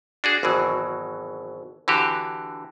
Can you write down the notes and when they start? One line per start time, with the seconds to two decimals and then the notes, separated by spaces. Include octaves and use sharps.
0.24 D4 F#4 G#4
0.43 G#1 B2 E3 F#3
1.88 D3 E3 F#4 G4